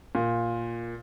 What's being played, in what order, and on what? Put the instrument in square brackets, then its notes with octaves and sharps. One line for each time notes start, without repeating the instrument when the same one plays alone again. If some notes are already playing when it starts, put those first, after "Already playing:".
[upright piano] A#2